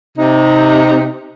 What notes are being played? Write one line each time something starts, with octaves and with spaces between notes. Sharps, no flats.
C3 D#4